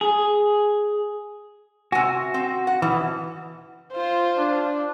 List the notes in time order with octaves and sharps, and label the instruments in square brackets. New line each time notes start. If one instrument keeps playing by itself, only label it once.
[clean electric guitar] G#4
[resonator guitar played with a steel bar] C3 G#5 [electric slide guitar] F#4
[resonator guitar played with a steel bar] C4
F#5
[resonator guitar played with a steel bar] B2 [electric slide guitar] E3
[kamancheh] F4 C5
[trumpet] D4